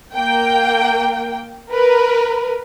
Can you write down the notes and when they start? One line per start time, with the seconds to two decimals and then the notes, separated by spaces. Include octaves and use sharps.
0.15 A#3 G5
1.71 A#4 B4